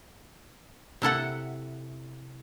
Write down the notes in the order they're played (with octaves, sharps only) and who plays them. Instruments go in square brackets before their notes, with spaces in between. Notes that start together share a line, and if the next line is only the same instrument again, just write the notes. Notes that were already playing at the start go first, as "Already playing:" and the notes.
[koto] C3 E4 A4 F#5